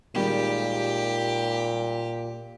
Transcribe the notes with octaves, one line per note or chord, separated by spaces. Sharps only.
A#2 D#3 G3 G#3 G4